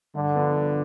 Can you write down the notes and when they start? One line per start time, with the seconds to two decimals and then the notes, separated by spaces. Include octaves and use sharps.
0.15 G2 D3
0.35 F3 B3 D4
0.55 G2